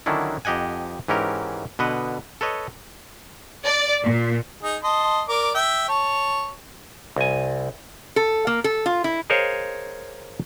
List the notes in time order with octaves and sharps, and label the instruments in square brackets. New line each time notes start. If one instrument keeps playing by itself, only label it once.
[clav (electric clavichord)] D3 D#3 F#3 C#4 D4 E4
F2 G4 D#5 F#5 G#5
G#2 E3 C#4 G4 A#4
B2 D3 B4 D#5 F#5
A4 B4 C#5 D#5
[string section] D5
A#2
[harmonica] D#4 G#4
D#5 A5 C6
A#4 D5 D6
E5 G5
C#5 A5
[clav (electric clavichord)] C2 G#5
[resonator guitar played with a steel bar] A4
A#3
A4
F4
E4
[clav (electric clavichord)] G#4 A#4 C5 C#5 D#5 F5